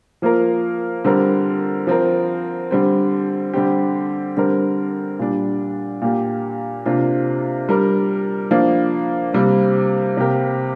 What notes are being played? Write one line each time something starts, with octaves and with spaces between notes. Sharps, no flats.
F3 A#3 F4 A#4
D3 G3 C4 A#4
F3 C4 A#4
D3 G3 C4
D3 G3 C4 G4
D3 G3 C4 A#4
A#2 G3 D4
A#2 A#3 G4
C3 A#3 D4 F4
G3 D4 A#4
F3 A#3 D4
C3 G3 A#3
C3 A#3 G4 A#4